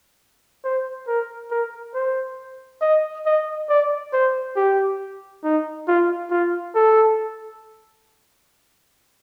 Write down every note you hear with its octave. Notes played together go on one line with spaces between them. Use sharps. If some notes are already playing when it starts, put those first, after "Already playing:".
C5
A#4
A#4
C5
D#5
D#5
D5
C5
G4
D#4
F4
F4
A4